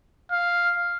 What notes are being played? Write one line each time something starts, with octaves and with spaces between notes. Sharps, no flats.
F5